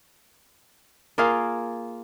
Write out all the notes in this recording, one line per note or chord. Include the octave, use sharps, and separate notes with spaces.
A#3 F4 G#4 F5